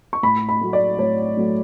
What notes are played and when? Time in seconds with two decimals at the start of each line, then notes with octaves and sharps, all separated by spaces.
0.13 C#6
0.23 A2 B5
0.49 B5
0.61 F#3 A3
0.73 D5
0.99 A2 C#5
1.37 F#3 A3